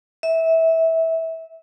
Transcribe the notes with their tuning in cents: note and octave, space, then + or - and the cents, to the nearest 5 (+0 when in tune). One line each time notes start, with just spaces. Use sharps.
E5 -20